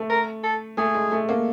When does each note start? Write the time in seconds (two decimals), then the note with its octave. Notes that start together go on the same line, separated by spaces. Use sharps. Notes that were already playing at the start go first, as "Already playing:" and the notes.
Already playing: A3
0.10 A#4
0.44 A4
0.77 A3 G#4
0.95 G#3
1.12 A3
1.29 A#3